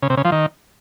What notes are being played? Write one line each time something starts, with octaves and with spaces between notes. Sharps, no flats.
C#3
C3
C#3
F3
D#3